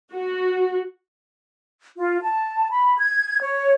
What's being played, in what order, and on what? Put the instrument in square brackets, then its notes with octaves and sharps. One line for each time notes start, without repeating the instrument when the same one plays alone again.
[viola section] F#4
[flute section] F4
A5
B5
G#6
C#5